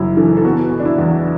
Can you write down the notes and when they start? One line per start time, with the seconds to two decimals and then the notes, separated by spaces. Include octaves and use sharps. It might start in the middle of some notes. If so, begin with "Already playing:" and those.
Already playing: F#1 F#2 E4
0.17 E3 A4
0.37 A4
0.44 B3 F#4
0.71 B2
0.80 D4
0.85 E4
0.99 E2